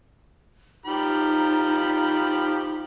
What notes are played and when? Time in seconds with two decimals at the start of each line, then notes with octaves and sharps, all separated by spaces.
0.86 F3 D#4 G4 B5